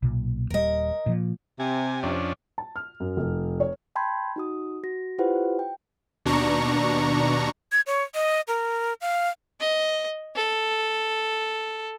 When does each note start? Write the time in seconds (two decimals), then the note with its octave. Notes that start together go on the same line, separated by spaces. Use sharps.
0.02 B1 A#2
0.50 D#1 G3 A#4 D#5
1.06 A#2 F3
1.60 C3 G#5
2.03 F2 C#4 D4
2.58 A5
2.76 F6
3.00 F#2
3.17 F1
3.60 C#5
3.96 G5 A5 B5 C6 G6 G#6
4.36 D#4 F#4 D#6
4.84 F#4 A#6
5.18 E4 F4 G4 B4 C5 F#5
5.59 G5
6.25 D#2 B2 D4 A#5 C#6
7.72 G#6
7.87 C#5
8.15 D#5
8.48 A#4
9.01 F5
9.60 D#5
10.35 A4